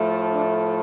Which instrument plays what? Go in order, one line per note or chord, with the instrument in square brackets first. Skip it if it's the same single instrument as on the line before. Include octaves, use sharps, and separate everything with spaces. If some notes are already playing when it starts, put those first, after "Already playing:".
Already playing: [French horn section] A2 F3 A3
D4